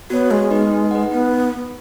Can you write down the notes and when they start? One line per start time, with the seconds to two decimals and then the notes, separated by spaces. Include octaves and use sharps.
0.10 B3 F#4 C#5
0.31 G#3 B3
0.51 D#4 B4
0.71 D#4
0.91 B4 F#5
1.11 B3 D#4